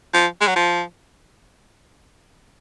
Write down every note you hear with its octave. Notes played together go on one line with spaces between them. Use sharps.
F3
G#3
F#3
F3